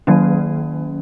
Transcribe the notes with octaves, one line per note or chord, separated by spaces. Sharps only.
D#3 F#3 A#3 C#4